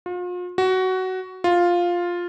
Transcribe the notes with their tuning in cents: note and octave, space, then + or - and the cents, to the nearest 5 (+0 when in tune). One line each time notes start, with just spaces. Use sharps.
F4 +40
F#4 +15
F4 +5